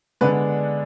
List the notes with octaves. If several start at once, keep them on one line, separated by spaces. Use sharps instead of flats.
D3 G#3 B3 D4 B4